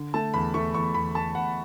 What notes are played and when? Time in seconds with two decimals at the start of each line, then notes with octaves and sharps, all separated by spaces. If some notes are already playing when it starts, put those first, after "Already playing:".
Already playing: D3
0.14 A3 A5
0.34 E2 B5
0.54 A3 C#6
0.74 E2 C#6
0.95 E2 B5
1.15 A3 A5
1.35 E2 F#5